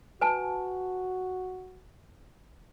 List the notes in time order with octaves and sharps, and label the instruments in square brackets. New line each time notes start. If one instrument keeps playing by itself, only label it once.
[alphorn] F#4 [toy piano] B4 G#5 A5